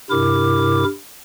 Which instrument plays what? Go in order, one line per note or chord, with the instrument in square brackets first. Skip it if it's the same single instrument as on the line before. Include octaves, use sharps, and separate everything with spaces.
[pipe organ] G2 C3 E4 A#4 D6